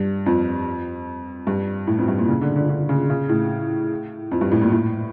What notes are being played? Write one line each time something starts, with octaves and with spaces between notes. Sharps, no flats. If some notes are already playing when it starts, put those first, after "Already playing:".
Already playing: G2
F2
G2
A2
F2
G2
A#2
C#3
D3
D3
D3
C#3
C#3
A2
F2
G2
A2
A#2
A2